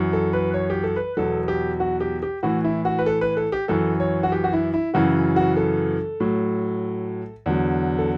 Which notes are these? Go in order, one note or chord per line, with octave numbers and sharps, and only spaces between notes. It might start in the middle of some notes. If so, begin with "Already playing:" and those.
Already playing: F#2 E3
A4
B4
C#5
G4
A4
B4
E2 B2 F#3 A4
G4
F#4
G4
G4
A2 E3 F#4
E4
F#4
B4
A4
B4
A4
G4
F#2 E3 A4
C#5
F#4
G4
F#4
E4
E4
F#2 C#3 E3 F#4
F#4
A4
A2 F#3
E2 D3 F#3
A4